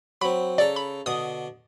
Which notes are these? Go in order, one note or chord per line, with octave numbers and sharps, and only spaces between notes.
F#3 C4 B5
C#3 A4 D5 A#5
B5
B2 D3 D#6